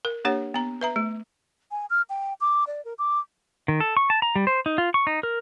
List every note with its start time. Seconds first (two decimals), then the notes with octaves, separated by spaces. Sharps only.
0.05 A#4
0.25 A#3 D4 G4 C#5 F#5
0.54 B3 A#5
0.81 B4 E5 A#5
0.96 A3
1.71 G#5
1.90 F6
2.10 G5
2.41 D6
2.67 D5
2.85 A#4
2.99 D6
3.68 D#3
3.80 A4
3.97 C#6
4.10 A5
4.22 A#5
4.36 G3
4.47 C5
4.66 D#4
4.78 F4
4.94 C#6
5.07 D#4
5.23 A#4